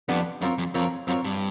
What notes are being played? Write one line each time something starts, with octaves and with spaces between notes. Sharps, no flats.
F2 G3 B3 D4
F#2 C4 F4 A#4 C#5
F2
F2 C4 F4 A#4 C#5
F#2 C4 F4 A#4 C#5
G2